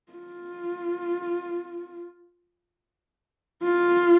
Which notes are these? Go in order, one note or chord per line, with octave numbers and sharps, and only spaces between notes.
F4
F4